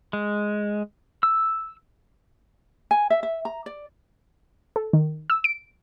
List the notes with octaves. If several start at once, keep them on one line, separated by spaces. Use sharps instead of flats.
G#3
E6
G#5
E5
E5
A#5
D5
A4
D#3
E6
D7